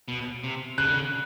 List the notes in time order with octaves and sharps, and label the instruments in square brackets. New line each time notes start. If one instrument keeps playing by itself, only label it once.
[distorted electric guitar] B2
C3
[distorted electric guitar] C#3 [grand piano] F#6
[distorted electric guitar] D3
C#3